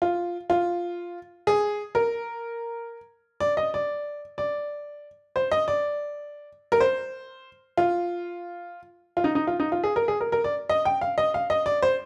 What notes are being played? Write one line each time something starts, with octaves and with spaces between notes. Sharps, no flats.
F4
F4
G#4
A#4
D5
D#5
D5
D5
C5
D#5
D5
A#4
C5
F4
F4
D#4
D#4
F4
D#4
F4
G#4
A#4
G#4
A#4
A#4
D5
D#5
G5
F5
D#5
F5
D#5
D5
C5